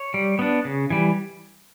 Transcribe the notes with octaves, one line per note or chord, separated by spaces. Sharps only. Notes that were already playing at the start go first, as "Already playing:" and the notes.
Already playing: C#5
G3
B3 D4
C#3
E3 G3